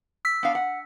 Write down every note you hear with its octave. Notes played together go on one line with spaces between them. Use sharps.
E6 B6
B3 D4 F5
F#5